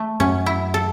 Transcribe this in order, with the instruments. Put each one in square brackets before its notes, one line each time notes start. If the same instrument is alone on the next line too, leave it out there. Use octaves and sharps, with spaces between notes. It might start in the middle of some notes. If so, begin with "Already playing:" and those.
Already playing: [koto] A3
[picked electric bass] F#2 [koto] C#4
[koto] E4
A4